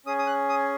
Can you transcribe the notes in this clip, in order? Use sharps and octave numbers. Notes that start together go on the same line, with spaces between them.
C#4 G#4 D#6
D#6
F#6
D#6